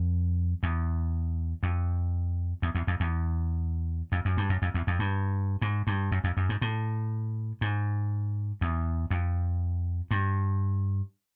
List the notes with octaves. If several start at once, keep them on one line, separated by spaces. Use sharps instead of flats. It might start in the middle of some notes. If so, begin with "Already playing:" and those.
Already playing: F2
E2
F2
E2
E2
F2
E2
F2
F#2
G2
F#2
F2
E2
F2
G2
G#2
G2
F#2
F2
F#2
G#2
A2
G#2
E2
F2
G2